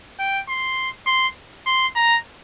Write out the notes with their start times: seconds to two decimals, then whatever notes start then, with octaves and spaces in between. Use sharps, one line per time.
0.19 G5
0.48 C6
1.07 C6
1.66 C6
1.95 A#5